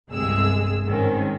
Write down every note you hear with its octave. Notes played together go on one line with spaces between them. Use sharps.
G1 C2 C3 G#3 G#4 E6
G#2 D#3 G#3 C4 C#4